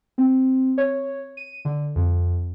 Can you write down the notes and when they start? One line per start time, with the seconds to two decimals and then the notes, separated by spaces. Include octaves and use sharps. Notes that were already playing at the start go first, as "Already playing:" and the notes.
0.18 C4
0.78 C#5
1.37 D#7
1.65 D3
1.96 F2